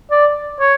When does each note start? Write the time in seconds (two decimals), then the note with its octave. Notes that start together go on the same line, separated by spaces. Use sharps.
0.11 D5
0.60 C#5